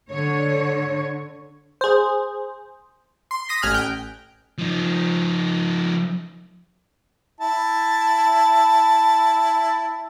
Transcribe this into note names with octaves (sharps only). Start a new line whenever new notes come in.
D3 C#5
G#4 C5
C6
D#6 A#6 B6
A1 G#5 F6 F#6
G5
F3 D#4
E4 A5